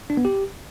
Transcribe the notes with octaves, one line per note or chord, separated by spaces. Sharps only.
D4
B3
G4